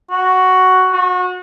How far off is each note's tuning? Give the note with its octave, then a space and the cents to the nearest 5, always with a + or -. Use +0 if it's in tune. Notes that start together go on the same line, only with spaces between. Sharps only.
F#4 +5
F#4 -30